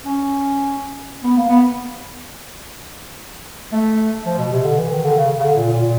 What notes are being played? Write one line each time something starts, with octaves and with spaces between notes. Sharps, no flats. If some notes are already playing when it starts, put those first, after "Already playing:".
C#4
B3
A#3
B3
A3
F3
B2
C3
D3
E3
D#3
D3
C#3
C#3
D3
A#2
A#2
A#2